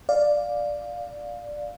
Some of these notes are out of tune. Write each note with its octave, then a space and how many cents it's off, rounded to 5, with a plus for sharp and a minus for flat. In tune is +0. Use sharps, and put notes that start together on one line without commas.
D5 +0 F5 +10